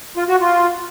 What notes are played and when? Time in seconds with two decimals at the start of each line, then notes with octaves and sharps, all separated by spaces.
0.17 F4
0.28 F#4
0.40 F4